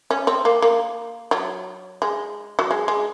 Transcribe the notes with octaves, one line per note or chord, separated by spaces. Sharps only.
C#4
C4
A#3
A#3
F#3
G#3
F#3
G#3
G#3